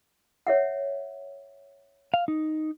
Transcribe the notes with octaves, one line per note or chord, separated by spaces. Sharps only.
C#5 E5 F#5
F5
D#4